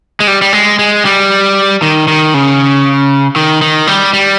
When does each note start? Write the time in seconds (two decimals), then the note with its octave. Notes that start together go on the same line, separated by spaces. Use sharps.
0.20 G#3
0.27 G3
0.42 G3
0.53 G#3
0.79 G#3
1.05 G3
1.82 D#3
2.08 D#3
2.34 C#3
3.36 D#3
3.61 D#3
3.87 G3
4.13 G3